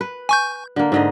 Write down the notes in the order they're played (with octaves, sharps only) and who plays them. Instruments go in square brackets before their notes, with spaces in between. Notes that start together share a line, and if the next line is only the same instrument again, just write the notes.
[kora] B4
[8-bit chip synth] G#5 C#6 G6
[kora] D3 A#3
G#2 D3 D#5